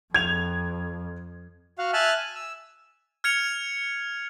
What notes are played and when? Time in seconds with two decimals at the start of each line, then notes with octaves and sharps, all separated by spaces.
0.14 F2 G#6 F7
1.78 F#4 F5 F#5
1.93 E5 G#5 A5 F6 F#6
2.17 G#5
2.35 E6
3.24 F6 G#6 C#7 F7